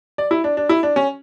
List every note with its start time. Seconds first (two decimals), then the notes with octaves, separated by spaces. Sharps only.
0.18 D5
0.31 E4
0.44 D4
0.57 D4
0.69 E4
0.83 D4
0.96 C#4